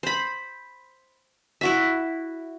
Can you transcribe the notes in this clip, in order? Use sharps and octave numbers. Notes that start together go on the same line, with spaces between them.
C5 B5
E4 F#4 E5